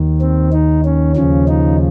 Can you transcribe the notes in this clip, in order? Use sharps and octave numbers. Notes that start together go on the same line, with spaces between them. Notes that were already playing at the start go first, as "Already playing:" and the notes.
Already playing: D#2 D#3
C4
D#4
C#4
D#2 C#3 F3 C#4
D#4